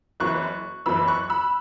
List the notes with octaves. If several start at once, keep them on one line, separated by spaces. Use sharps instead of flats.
F#1 F#2 E3 C#6 F#6
F#1 F#2 E3 B5 E6
C#6 F#6
B5 E6